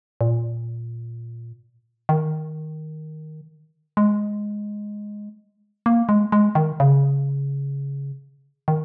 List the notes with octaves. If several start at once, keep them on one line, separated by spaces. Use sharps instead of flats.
A#2
D#3
G#3
A#3
G#3
G#3
D#3
C#3
D#3